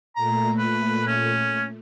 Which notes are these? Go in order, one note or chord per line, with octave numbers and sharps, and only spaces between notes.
A#2 A3 A#5
B4
C#4